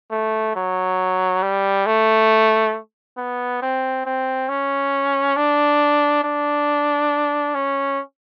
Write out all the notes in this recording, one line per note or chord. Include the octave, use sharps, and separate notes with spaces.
A3
F#3
G3
A3
B3
C4
C4
C#4
D4
D4
C#4